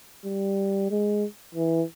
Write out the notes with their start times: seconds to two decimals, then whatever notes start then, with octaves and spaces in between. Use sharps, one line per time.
0.25 G3
0.90 G#3
1.55 E3